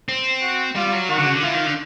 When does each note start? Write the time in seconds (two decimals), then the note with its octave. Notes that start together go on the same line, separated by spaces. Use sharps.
0.09 C4
0.42 F#4
0.76 G3 F4
0.93 F#3
1.09 D#3 F#4
1.18 D3
1.26 C#3
1.35 D3
1.43 E3 F4
1.54 D#3
1.66 D3